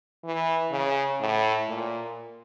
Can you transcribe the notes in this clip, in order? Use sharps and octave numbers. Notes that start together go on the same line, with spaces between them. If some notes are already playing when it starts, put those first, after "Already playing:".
E3
C#3
A2
A#2